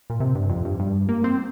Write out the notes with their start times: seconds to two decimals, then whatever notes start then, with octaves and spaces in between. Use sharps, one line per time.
0.10 A#2
0.20 C3
0.35 G2
0.50 F2
0.65 G2
0.80 G2
1.09 A#3
1.24 C4